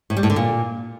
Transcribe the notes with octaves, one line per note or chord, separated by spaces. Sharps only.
A2
G3
A2
D3
A#2